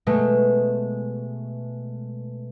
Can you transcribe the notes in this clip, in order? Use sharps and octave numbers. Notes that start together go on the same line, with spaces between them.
B2 G#3 A3